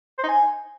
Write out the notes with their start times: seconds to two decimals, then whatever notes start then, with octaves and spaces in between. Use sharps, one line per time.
0.18 C5
0.24 D#4
0.29 G#5